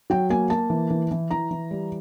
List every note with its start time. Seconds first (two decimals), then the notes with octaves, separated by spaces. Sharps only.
0.10 F#3 G5
0.30 A#3 G#5
0.50 A#3 A5
0.70 E3
0.90 E3
1.11 E3
1.31 E3 A#5
1.51 E3
1.71 G3